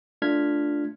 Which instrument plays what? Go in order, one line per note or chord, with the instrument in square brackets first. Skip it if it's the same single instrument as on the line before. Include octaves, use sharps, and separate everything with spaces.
[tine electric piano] A3 D4 F4 F6 G#6 B6